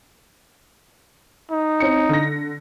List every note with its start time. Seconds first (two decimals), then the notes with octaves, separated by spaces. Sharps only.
1.51 D#4
1.80 C4 C#4 C#7
2.09 D3 A#6